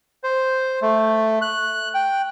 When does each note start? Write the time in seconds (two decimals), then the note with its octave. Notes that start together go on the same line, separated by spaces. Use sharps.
0.23 C5
0.82 A3
1.42 F#6
1.94 G5